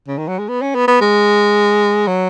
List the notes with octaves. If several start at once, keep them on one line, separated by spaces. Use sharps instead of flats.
C#3
D#3
F#3
G#3
B3
C#4
B3
B3
G#3
F#3